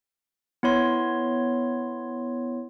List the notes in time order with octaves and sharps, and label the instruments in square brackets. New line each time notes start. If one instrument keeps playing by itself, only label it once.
[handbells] B3 E4 C#5 C6